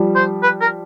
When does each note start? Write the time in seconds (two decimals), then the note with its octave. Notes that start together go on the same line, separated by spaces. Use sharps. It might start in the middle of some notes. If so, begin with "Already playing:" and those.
Already playing: F3 G3
0.15 C5
0.43 B4
0.61 A#4